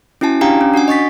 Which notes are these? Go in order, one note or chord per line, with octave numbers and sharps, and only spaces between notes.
C#4 E4 F#4 G#5 A5
D4 G4 F5 G5 G#5 A#5
C#4
D4 F#4 F#5 G#5
D#5 C#6 A6 B6